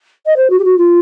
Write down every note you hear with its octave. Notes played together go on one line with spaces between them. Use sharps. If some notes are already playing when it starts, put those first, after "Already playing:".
D#5
C5
F#4
G4
F#4
F4